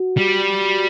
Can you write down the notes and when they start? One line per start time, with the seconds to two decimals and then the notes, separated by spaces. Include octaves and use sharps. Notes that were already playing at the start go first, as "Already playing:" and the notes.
Already playing: F#4
0.17 G3